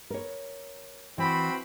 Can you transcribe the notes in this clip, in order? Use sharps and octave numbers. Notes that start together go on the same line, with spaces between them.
A#4 C#5
E3 C4 F#4 B5